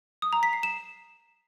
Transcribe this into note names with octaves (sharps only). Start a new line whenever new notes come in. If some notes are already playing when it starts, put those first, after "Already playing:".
D#6
A#5
B6
C7
E7